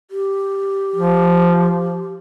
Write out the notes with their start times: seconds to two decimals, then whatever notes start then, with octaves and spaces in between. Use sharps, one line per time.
0.11 G4
0.96 F3